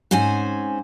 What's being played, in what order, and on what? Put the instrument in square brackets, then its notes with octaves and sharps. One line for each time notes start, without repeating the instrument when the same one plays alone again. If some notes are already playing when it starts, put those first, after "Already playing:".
[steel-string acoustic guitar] G#2 C4 C#4 C5 G#5